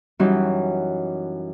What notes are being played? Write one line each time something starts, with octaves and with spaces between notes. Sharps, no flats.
F#2 E3 F#3 G3 C#4 D#4